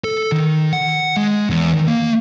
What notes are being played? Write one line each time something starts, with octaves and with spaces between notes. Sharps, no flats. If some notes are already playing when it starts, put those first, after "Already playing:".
A4
D#3
F#5
G#3
E2
D#3
A#3